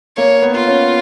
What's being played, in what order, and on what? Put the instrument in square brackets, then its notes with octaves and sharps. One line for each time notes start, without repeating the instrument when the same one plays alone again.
[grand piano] A#3 [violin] C#5
[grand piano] B3
[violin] F4
[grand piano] C#4